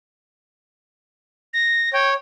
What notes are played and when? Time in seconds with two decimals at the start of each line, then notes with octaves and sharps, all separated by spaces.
1.54 A#6
1.93 C#5 G5